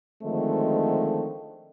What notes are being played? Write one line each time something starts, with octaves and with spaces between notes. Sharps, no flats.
D3 D#3 F3 G#3 A3 C4